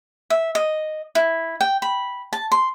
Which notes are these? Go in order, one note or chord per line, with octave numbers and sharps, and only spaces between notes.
E5
D#5
E4
G5
B5
A5
C6